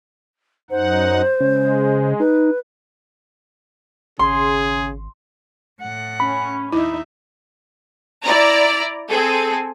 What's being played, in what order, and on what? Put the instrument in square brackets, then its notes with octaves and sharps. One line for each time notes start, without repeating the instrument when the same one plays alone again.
[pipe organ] F#2 D#4 F#5 [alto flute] C5
[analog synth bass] C#3 [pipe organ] G#3
[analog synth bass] D#4 [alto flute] B4
[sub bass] G#1 [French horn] C#3 [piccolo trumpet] G#4 [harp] C6
[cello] A2 F#5
[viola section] C#4 [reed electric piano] B5
[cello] D#2 E5 [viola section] D#4 [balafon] E4
[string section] E4 D5 A#5
C4 G#4 A4